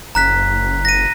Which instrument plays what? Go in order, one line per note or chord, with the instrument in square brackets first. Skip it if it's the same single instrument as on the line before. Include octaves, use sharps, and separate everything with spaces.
[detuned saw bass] F#1 [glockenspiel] A#5 F#6 B6
[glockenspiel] A#6 D#7